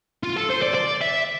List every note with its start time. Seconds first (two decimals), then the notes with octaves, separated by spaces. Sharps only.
0.23 F4
0.37 A4
0.50 C5
0.62 D5
0.75 D5
1.02 E5